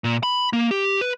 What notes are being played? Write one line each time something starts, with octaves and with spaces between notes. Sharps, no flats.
A#2
B5
A#3
G4
B4